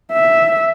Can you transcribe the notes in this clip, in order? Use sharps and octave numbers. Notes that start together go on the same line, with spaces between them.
E5